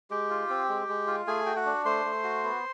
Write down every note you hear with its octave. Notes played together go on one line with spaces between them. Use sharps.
G#3 G4 G5
F4
C4
G#3
G#3
F4
A3 G#4 G#5
F#4 G5
F#4 F#5
D4
A3 C5 C6
A3
F#4
B3